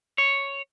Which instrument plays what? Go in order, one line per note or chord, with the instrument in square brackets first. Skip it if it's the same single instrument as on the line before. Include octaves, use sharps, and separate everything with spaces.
[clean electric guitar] C#5